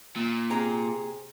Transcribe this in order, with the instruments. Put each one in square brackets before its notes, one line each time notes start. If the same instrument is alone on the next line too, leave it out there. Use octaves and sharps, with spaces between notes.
[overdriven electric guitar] A#2
[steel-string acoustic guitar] C3 G#4 A#5